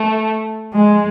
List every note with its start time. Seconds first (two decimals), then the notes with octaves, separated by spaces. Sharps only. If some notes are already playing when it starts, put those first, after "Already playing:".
Already playing: A3
0.74 G#3